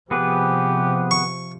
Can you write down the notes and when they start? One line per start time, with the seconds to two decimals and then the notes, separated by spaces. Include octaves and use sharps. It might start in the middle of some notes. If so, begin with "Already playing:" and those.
0.11 C3 F3 B3 G4 G#4 B4
1.11 C#6